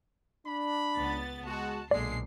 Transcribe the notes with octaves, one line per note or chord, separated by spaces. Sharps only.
D4 B5
C#2 B3 A6
G#3 F#4 A5
B1 A#2 D3 G#3 D5 C7